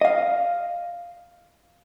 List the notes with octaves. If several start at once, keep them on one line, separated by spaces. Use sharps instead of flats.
D#5 F5